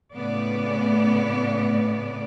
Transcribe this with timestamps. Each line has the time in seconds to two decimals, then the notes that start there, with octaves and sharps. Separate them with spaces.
0.13 A2 C#3 A3 B3 D5